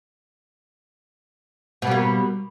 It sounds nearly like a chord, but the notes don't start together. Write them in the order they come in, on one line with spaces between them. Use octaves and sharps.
B2 G3 A#3